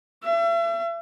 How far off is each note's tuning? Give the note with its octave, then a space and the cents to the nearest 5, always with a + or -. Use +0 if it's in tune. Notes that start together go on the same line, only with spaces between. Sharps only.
E5 +40